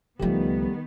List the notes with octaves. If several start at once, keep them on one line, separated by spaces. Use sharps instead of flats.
C#2 D#3 F3 G3 A3 B3 G4